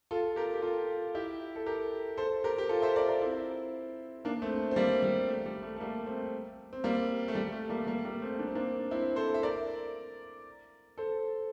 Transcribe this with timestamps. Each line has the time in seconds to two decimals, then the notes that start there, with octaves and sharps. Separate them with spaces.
0.11 F4 A4
0.36 G4 A#4
0.54 G4
0.62 F4 A4
1.15 E4 G4
1.56 A4
1.66 G4 A#4
2.17 A4 C5
2.44 G4 A#4
2.58 G4
2.69 F4 A4
2.82 C5 E5
2.96 A#4 D5
3.08 A#4 D5
3.21 C4 E4
4.25 A#3 D4
4.42 A3 C4
4.71 C4
4.76 G3 A#3
5.03 G3
5.28 A3
5.46 G3
5.62 A3
5.76 A3
5.80 G3 A#3
6.06 A3 C4
6.73 C4
6.84 G3 A#3
7.28 A3
7.35 G3
7.52 A3
7.70 G3 A#3
7.87 G3 A#3
8.05 G3 A#3
8.22 A3 C4
8.39 D4
8.48 C4
8.55 A#3 D4
8.91 C4 E4
9.16 A4 C5
9.34 E5
9.43 A#4 D5
10.98 A4 C5